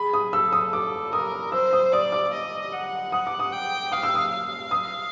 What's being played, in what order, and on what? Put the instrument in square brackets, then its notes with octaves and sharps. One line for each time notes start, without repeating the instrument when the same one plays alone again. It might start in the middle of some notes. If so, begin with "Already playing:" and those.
Already playing: [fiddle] G#4 [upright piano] B5
[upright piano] D#6
[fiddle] A4 [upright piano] E6
[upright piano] D#6
[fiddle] A4 [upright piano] D6
[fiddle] A#4 [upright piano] D#6
[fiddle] C5 [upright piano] E6
[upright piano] D#6
[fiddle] D5 [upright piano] D#6
[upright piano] D6
[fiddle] D#5
F#5
[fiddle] F#5 [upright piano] D#6
[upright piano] D6
D#6
[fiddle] G5
[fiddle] F5 [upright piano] D#6
[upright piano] E6
D#6
[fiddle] F5
[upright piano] D#6